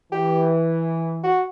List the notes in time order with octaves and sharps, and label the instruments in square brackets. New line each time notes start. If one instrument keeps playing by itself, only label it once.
[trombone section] E3 [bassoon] G4
[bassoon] F#4